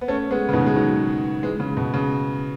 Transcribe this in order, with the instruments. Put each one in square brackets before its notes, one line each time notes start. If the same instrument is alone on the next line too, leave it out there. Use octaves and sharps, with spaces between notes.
[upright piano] B3
A3 C#4
G#3 B3
C#3
B2 D#3
G#3
D#3 F#3
E3 G#3
C#3
B2
C#3